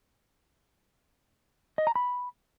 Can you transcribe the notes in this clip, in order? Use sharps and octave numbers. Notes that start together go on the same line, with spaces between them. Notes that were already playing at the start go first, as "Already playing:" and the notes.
D#5
A#5
B5